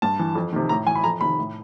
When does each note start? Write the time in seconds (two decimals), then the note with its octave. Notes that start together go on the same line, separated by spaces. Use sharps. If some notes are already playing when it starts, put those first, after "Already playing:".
0.02 G2 A5
0.19 E3
0.35 F2
0.53 C3 D#3
0.69 A2 A#5
0.87 E3 G#5
0.95 B5
1.04 F2 A#5
1.21 C3 D#3 B5
1.39 A2